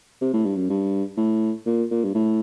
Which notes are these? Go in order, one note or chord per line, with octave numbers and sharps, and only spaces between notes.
C3
A2
G2
F#2
G2
A2
A#2
A#2
G2
A2